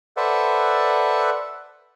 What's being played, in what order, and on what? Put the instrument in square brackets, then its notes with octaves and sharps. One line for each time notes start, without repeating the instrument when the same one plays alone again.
[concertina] A4 B4 C5 D5 E5 F#5